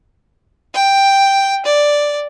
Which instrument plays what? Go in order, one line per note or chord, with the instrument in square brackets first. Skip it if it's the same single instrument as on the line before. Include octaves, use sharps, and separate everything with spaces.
[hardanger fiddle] G5
D5